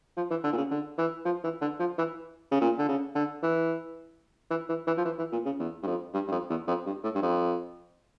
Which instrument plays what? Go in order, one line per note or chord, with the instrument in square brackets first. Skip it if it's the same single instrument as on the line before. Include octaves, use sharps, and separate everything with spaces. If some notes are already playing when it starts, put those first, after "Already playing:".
[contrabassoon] F3
E3
D3
A#2
C#3
D3
E3
F3
E3
D3
F3
E3
C#3
A#2
D3
C#3
D3
E3
E3
E3
E3
F3
E3
E3
A#2
C#3
E2
G2
F2
G2
G2
F2
E2
F2
G2
A2
G2
F2